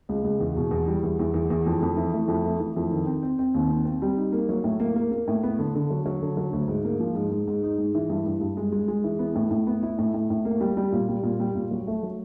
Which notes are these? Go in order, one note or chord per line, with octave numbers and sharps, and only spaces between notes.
C#2
C#2
E2
B2
E2
G3
E2
E2
E2
E2
F2
F2
E3
A3
F2
A3
E3
F2
D#3
C4
C4
C4
D#2
C4
C4
G3
D#4
A#3
F#3
A2
A#3
A#3
A#3
A2
B3
D3
D3
F#3
F#3
D3
F#3
D2
G#2
A#3
F3
G#2
G#2
G#2
D#4
G#2
E3
G2
G2
G2
G#3
G#3
G#3
E3
B3
A2
A2
B3
E4
A2
A2
A2
A#3
G3
G3
A#2
G3
A#2
G3
A#2
F#3
A3
F#3